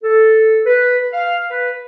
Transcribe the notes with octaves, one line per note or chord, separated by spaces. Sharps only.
A4
B4
F5
B4